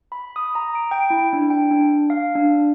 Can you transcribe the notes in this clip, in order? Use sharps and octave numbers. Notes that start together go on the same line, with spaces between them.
B5
D#6
A#5
D7
G5
E4
D4
G5
D4
F5
D4